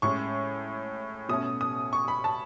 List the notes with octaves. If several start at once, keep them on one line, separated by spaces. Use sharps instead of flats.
A2 G#3 C#4 C#6
B2 A3 C#4 D#6
D#6
C#6
B5
A5